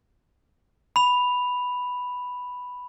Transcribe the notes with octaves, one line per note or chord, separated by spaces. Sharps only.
B5 F7